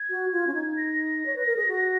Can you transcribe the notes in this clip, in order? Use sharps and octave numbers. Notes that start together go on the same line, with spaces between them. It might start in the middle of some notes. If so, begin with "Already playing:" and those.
Already playing: G#6
F#4
F4
C#4
D#4
A#6
C#5
B4
A#4
G#4
F#4